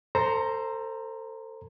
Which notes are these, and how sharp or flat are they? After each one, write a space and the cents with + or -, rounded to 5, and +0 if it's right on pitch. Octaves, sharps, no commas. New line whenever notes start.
A4 +30 C5 +0 A#5 +0